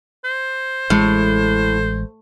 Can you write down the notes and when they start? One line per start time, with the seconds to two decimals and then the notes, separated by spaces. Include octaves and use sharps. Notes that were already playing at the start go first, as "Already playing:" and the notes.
0.24 C5
0.90 A1 A2 G#3